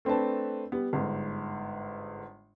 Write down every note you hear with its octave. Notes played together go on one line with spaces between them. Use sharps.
A3 C4 D4 B4 A5
G3 B3
G1 G#2